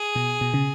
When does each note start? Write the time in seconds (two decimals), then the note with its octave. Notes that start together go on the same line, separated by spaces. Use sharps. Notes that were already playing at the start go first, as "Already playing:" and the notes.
Already playing: G#4
0.16 B2
0.41 B2
0.54 C#3